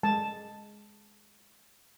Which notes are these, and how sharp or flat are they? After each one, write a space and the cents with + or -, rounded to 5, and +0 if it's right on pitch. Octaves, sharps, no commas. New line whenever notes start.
G#3 +0 A5 +0